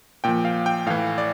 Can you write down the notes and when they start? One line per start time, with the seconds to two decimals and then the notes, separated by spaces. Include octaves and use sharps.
0.24 A#2 F3 G5
0.45 F5
0.66 G5
0.86 A2 E3 F5
1.18 D5